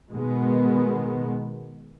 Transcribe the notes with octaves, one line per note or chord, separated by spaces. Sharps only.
B2 D#3 G#3 B3